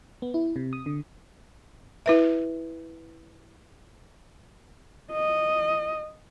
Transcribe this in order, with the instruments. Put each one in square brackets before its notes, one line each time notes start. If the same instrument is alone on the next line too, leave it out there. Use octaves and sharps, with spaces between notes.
[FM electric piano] B3
E4
C3
D#6
D3
[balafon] E4 B4 E5
[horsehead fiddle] D#5